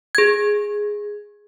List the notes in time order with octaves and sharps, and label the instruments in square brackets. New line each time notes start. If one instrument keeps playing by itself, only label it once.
[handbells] G#4 G#6